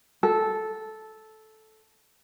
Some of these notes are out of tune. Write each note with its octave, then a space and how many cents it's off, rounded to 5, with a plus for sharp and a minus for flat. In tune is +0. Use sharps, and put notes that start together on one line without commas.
A4 -10